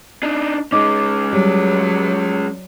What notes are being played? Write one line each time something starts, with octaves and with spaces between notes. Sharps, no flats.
D4 D#4
G#3 C#4 D#4 D6
F#3 G3